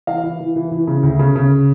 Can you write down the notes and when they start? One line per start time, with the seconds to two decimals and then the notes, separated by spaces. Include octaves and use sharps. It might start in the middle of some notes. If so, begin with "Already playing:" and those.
0.07 E3 F5
0.23 E3
0.40 E3
0.56 E3
0.71 E3
0.87 C#3
1.03 D2
1.19 C#3
1.36 C#3